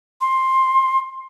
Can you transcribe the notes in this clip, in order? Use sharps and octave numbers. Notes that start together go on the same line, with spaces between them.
C6